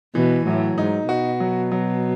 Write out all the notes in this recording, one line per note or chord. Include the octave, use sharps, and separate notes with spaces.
B2 E3
A2 F#3
G#2 D#4
B2 F#4
F#3
F#3